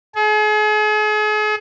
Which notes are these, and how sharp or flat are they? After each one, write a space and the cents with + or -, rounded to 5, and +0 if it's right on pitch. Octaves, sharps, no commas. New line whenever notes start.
G#4 +40